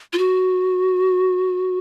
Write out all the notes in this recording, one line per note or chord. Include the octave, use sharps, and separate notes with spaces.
F4
F#4